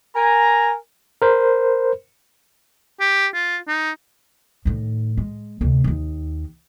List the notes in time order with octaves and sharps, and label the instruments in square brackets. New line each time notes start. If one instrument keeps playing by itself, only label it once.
[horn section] A#4 G#5 A#5
[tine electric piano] A#4 C5
[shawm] G4
F4
D#4
[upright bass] A2 D#3
G#3
D2 C3
D#2 D#3